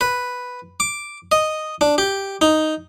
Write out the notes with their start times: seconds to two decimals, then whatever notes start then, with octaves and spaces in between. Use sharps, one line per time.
0.01 B4
0.80 D6
1.32 D#5
1.81 D4
1.98 G4
2.41 D#4